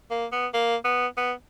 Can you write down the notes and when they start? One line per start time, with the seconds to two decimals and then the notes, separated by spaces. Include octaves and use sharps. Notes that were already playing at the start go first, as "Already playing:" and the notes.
0.11 A#3
0.32 B3
0.54 A#3
0.84 B3
1.17 B3